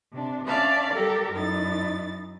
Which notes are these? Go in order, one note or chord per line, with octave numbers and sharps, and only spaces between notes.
C3 D4
C#4 D4 D5 E5 F5 A5
G3 G4 A4 A#4
F#2 D#4 E4 A6